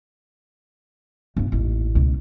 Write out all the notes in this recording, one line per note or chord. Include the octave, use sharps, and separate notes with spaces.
G2 B3
A1 D#2
C#2 B2